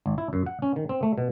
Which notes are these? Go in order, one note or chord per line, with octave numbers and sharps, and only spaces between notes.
G#1
E4
F#2
F#5
C#4
D#3
C4
A3
B2